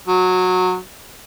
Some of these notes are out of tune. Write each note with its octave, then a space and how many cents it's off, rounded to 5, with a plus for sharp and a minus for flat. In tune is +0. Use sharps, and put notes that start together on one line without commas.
F#3 -15